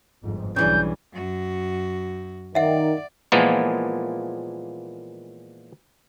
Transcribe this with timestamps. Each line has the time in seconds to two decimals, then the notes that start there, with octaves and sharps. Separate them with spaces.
0.23 G1 F2 G#2
0.56 B1 C#3 E3 G3 D4 G6
1.13 F#2 F#4
2.55 D#3 D5 E5 F#5
3.32 A#2 E3 F3 G#3 A#3 B3